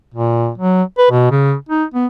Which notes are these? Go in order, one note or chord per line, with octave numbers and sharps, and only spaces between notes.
A#2
F#3
B4
B2
C#3
D#4
B3